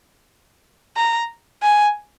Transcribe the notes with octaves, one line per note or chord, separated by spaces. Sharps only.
A#5
G#5